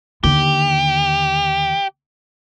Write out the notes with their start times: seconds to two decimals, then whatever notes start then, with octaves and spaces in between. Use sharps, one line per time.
0.24 D#2 D3 G4